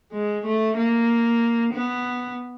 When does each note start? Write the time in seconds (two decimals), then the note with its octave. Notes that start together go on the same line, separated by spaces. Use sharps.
0.13 G#3
0.45 A3
0.76 A#3
1.73 B3